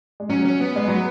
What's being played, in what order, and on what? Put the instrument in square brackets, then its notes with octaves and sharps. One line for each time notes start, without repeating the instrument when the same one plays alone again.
[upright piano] G#3
[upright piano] F#3 [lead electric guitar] C#4
[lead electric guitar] C#4
B3
[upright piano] G#3
F#3